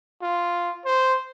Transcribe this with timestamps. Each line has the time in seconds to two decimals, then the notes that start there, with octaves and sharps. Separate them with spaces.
0.22 F4
0.86 C5